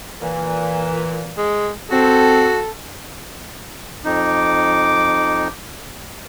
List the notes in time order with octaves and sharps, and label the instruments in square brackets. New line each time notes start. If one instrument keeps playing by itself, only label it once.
[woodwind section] A#2 E3
[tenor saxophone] G#3
[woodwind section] C4 [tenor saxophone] F#4 [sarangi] A4
[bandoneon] F2 D#4 [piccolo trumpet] D6